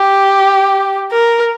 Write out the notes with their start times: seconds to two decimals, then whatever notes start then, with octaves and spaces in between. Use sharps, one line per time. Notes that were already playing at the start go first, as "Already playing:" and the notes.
Already playing: G4
1.12 A#4